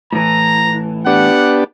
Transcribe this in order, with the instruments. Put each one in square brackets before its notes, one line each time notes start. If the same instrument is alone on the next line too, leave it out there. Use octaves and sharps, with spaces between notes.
[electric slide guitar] A2 E3 [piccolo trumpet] A#5
[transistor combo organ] B3 D4 G4 [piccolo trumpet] F#5